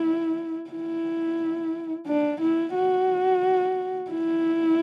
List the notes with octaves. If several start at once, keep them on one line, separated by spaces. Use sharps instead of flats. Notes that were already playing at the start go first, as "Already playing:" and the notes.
Already playing: E4
E4
D4
E4
F#4
E4